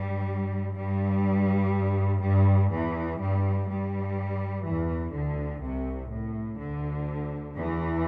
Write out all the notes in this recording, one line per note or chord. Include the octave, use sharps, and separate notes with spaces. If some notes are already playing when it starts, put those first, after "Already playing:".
Already playing: G2 G3
G2 G3
G2 G3
E2 E3
G2 G3
G2 G3
E2 E3
D2 D3
C2 C3
A2
D2 D3
E2 E3